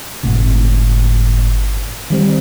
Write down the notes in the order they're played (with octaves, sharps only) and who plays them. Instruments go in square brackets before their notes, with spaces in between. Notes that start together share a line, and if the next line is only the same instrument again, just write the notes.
[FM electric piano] G1 A2 C3
D#3 G3 C4